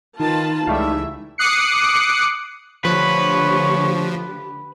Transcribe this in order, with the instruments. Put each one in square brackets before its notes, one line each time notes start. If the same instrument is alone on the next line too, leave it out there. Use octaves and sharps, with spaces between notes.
[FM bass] D#3 [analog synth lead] D#4 [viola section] F4 B4 A5
[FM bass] C#2 [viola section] E3 E5 [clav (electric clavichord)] G3 A3 F5
[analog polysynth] D6 D#6 F#6 C7 C#7
[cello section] D3 A3 G4 [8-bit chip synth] F3 [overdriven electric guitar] B4 [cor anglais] C#5